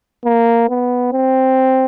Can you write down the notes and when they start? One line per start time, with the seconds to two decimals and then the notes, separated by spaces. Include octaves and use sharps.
0.25 A#3
0.69 B3
1.12 C4